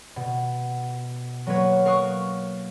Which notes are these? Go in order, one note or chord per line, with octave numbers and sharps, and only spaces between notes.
B2
F#3 A#3 B4 C#5
A#4 F5 C#6 D#6 F#6